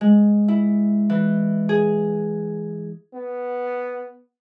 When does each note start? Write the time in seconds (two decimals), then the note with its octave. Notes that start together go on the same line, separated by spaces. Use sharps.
0.01 G#3
0.48 E4
1.10 E3
1.69 G#4
3.14 B3